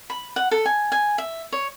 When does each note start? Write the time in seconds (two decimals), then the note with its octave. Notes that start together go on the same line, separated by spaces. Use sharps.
0.10 B5
0.36 F#5
0.51 A4
0.65 G#5
0.92 G#5
1.18 E5
1.52 C#5